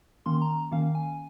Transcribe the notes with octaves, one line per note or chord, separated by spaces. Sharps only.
D#3 A#3 C#4 C6
A#5
D#3 A#3 C#4 F5
G#5